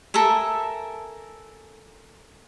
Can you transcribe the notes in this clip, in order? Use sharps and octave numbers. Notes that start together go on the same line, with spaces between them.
A4 A#4 E5 G#5